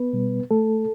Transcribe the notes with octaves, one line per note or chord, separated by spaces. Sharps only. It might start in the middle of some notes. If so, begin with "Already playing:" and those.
Already playing: B3 B4
B2 G3
A3 A4